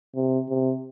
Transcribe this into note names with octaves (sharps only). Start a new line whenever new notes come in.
C3
C3